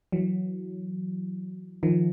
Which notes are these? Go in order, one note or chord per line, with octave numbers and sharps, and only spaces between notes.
E3 F#3
D#3 F3